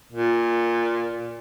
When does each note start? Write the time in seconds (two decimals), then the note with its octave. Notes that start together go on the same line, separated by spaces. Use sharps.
0.12 A#2